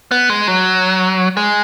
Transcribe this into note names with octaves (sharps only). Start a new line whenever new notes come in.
B3
G#3
F#3
G#3